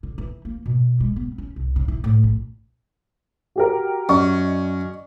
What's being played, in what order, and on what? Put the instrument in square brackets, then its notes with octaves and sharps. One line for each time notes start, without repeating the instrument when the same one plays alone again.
[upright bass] D3
E3
A#3
B2
G#3
B3
C#4
C2
C#3
E3
A2
A#1
[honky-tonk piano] F#4 G4 A#4
[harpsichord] F#2 [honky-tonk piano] D5 D#5 C#6